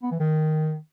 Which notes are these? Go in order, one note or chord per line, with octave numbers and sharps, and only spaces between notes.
B3
E3
D#3